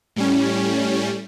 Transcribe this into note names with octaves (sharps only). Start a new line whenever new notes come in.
A2 G3 C#4